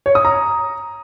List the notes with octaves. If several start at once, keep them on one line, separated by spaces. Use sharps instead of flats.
C#5
D#6
A#5